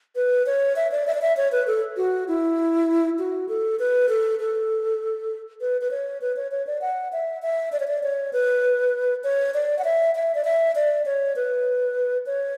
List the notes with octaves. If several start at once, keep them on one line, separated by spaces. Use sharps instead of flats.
B4
C#5
E5
D5
E5
D5
E5
C#5
B4
A4
F#4
E4
F#4
A4
B4
A4
A4
B4
B4
C#5
B4
C#5
C#5
D5
F#5
E5
E5
D5
C#5
D5
C#5
B4
C#5
D5
F#5
E5
E5
D5
E5
D5
C#5
B4
C#5